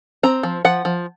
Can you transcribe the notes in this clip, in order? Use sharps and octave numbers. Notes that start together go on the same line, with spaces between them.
C4 A#5
F3
F3 F#5
F3